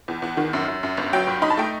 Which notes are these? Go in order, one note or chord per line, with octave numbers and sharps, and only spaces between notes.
E2
E2 F#5
D#3
F#2
F#2
F#2
G1
F#3 G5
G2
D#4 B5
A5
A3 G5